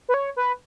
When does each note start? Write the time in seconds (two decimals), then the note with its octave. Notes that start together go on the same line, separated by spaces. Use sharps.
0.09 B4
0.14 C#5
0.36 B4